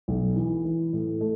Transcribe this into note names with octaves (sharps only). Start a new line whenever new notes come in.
B1
E3
E3
A2
A3